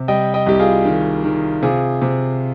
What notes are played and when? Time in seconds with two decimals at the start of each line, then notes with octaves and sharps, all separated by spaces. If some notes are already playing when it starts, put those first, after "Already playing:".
Already playing: C3
0.08 G3 D#5 G5
0.34 D#5 G5
0.46 C2 G4
0.60 F4 G#4
0.85 D#3
1.24 D#3
1.63 C3 F4 G#4
2.02 C3